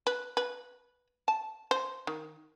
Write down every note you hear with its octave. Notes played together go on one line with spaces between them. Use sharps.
B4
B4
A5
C5
D#3